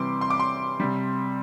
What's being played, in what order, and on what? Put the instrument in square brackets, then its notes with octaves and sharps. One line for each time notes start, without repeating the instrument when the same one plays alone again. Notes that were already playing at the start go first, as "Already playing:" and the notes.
Already playing: [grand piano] C3 E3 G3 C6 D6
C6
D6
C6
C3 G3